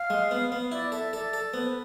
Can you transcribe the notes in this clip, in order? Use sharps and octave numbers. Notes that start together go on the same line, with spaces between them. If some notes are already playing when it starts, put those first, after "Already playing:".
Already playing: F5
G#3
B3
B3
E4 D5
A4 E5
A4 D5
A4
B3 C5
B4